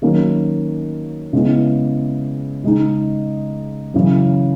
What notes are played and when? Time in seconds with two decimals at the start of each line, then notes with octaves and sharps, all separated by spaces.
0.02 D#3 F#3 A#3 C#4
1.33 C#3 G#3 B3 E4
2.64 C#3 G#3 D#4
3.94 F#2 C#3 E3